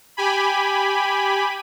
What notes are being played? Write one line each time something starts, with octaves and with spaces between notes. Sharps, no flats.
G4 G#5 B5